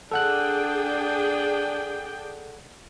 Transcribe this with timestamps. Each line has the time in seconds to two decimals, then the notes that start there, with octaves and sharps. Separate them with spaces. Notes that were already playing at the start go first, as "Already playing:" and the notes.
0.12 D4 G#4 A4 F#5 G5 F#6